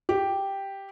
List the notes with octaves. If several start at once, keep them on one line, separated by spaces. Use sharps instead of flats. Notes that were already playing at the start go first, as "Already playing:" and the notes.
G4